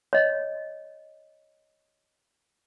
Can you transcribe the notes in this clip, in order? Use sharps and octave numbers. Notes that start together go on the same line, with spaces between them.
C#5 D#5